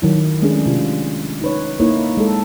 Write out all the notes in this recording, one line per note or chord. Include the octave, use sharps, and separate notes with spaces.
D#3 F#3 E4
G#3 A3 C#4 D4 G#4
C3 F4
D#4 B4 C#5
A#3 D#4 E4 C#5
G#3 A4